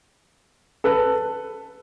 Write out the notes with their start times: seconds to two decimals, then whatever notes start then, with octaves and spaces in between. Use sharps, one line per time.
0.84 A4 B4